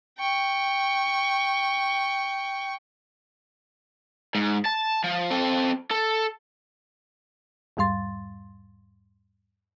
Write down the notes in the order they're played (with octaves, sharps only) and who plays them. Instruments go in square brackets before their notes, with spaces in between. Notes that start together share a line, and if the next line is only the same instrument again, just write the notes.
[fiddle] G5 C#6
[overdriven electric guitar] G#2
A5
F3
C4 A4
A4
[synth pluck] E2 G#2 G3 F5 C6 A6